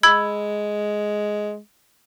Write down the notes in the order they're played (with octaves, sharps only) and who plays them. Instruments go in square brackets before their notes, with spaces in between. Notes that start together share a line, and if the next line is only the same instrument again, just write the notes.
[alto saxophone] G#3 [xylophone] B5 E6 G#6